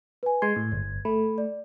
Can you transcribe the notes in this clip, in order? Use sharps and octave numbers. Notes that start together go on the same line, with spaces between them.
B4 G#5
G#3 C6 G#6
A2
G1
A3 A4 B5
D5